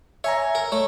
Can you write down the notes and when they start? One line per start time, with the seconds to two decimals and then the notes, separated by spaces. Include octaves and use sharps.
0.24 C#5 E5 G#5 A#5
0.55 A#4
0.72 A3 C#5